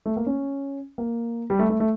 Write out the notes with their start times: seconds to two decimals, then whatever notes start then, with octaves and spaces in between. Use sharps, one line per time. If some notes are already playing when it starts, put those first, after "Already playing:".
0.06 A3
0.17 A#3
0.26 C#4
0.98 A#3
1.50 G3
1.59 A3
1.70 A3
1.80 A3